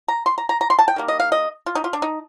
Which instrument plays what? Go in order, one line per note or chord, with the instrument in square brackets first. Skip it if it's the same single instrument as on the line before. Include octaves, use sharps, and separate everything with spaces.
[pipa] A#5
C6
A#5
A#5
A#5
C6
A5
G5
D#3 G3 A#3
D#5
F5
D#5
F4
D#4
F4
D4
D#4